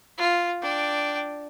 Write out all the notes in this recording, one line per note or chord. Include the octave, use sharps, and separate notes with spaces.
F4
D4 G5